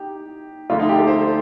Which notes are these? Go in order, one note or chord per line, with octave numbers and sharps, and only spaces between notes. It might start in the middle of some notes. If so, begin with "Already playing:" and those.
Already playing: D#4 G4
D2 D3 F3 F4
D#4
G4
A4
C5